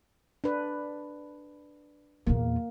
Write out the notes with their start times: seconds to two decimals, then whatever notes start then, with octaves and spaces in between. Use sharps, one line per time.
0.44 D4 B4
2.27 E2 A#2 A#3